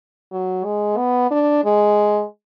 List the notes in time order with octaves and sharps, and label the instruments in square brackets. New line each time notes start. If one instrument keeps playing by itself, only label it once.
[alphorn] F#3
G#3
B3
D4
G#3